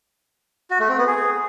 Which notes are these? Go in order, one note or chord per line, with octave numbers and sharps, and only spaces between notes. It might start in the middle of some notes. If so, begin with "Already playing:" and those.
F#4
A3
C4
B3
G#4